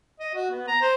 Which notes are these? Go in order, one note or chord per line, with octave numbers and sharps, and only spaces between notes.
D#5
F#4
B3
A#5
C5